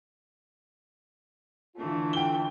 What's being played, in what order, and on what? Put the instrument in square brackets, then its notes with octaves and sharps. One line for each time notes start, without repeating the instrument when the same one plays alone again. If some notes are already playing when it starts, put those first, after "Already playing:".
[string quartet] D3 E3 A3 [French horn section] F4
[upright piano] G5 G7